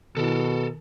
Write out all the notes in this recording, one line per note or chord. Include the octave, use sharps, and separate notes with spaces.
B2 D#3 E4 A4 A#4